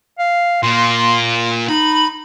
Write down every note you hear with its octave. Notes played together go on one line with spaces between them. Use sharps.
F5
A#2 C6
D#4 B5